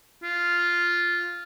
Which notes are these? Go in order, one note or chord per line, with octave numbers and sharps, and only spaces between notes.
F4